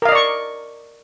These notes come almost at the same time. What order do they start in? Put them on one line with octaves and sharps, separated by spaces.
A#4 F5 D#5 D5 C#6